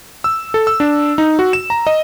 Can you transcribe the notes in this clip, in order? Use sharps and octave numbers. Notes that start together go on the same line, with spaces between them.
E6
A4
E6
D4
D#4
F#4
E7
A#5
D#5